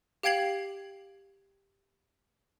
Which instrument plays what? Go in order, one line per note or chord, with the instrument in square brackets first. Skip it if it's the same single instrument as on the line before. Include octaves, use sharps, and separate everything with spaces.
[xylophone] G4 F5 G5 G#6 C7 F#7